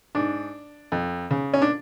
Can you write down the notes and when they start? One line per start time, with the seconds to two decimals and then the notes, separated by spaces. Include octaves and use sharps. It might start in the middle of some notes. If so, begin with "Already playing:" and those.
0.15 G#2 D4
0.92 F2
1.31 C#3
1.54 C#4
1.62 D4